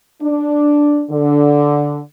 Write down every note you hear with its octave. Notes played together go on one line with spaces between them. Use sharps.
D4
D3